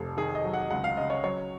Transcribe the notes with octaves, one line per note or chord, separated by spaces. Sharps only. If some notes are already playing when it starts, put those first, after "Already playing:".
Already playing: F1
D#3 G#4
D#5
F#3
F#5
C#2 F#5
F5
C#3 D#5
C#5
F#3 C#5